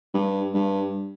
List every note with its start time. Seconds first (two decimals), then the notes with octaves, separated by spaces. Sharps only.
0.14 G2
0.54 G2